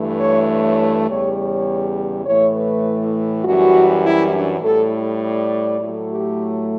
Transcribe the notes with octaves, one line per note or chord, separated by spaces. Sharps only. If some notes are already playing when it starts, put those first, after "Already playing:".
Already playing: G2 E3 A3
C#5
C#5
E2 C#3 G3 C#5
C#5
A2 E3 A3 C#5
B4
F#2 E3 G3 F#4
E4
D4
A2 G3 A4
D5
A2 F#3 A3
G4